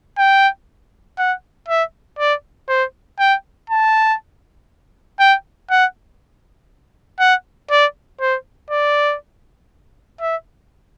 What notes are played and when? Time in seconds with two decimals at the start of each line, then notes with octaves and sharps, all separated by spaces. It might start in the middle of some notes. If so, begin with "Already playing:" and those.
0.18 G5
1.19 F#5
1.68 E5
2.19 D5
2.69 C5
3.20 G5
3.70 A5
5.20 G5
5.70 F#5
7.20 F#5
7.71 D5
8.21 C5
8.70 D5
10.21 E5